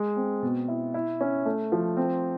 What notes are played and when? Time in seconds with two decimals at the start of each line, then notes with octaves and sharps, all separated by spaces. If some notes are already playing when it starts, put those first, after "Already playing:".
Already playing: G#3
0.16 C4
0.42 B2
0.68 E4
0.94 E4
1.21 C#4
1.46 A3
1.72 F3
1.97 C4